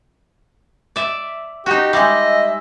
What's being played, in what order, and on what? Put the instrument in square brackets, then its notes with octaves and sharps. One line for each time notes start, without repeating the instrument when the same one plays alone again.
[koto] D5 E5
[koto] D#4 F#4 [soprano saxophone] G4
[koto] G3 G#3 [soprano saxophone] D#5 [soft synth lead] E5